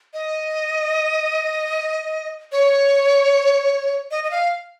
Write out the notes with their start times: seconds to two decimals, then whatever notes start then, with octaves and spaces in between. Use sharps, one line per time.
0.14 D#5
2.52 C#5
4.11 D#5
4.24 D#5
4.31 F5